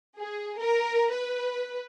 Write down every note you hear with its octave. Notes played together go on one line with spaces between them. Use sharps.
G#4
A#4
B4